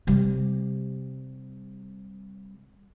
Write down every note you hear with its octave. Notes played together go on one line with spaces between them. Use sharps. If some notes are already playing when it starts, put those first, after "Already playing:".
C3 G3